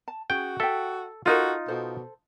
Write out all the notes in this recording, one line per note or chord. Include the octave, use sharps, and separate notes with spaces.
A5
C#4 F#4 G#4 G5
A4 E5 G5
D#4 F4 F#4 A4 A#4
B2 A4 C5